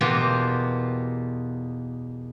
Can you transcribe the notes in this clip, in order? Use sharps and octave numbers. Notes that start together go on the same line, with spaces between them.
E2 B2 A#3 F4 G4